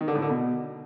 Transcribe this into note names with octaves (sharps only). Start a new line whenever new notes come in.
D#3
D3
A2
D3
B2